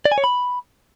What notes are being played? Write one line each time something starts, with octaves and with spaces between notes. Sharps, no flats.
D5
G#5
C#5
B5